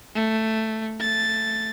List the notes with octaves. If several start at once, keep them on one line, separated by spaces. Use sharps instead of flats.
A3
A3 A6